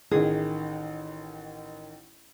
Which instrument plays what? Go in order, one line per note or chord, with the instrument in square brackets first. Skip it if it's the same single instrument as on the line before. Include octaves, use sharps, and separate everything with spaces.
[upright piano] A1 D#3 [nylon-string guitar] G#4